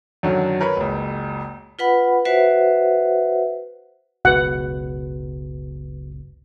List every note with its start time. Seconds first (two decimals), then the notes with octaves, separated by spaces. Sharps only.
0.23 F#2 D3 D#3 F#3
0.61 A#4 B4 C#5 B5
0.76 F#1 C#2
1.79 F4 B4 F#5 B5
2.25 F#4 B4 C5 E5 F#5
4.25 F#1 C#2 B2 F#4 B4 F#5